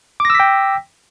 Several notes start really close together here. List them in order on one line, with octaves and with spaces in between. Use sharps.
D6 A#6 E6 B6 G5